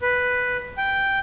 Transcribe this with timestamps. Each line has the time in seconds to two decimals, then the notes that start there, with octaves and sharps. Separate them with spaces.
0.02 B4
0.78 G5